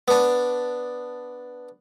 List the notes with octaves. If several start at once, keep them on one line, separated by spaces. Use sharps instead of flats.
B3 D4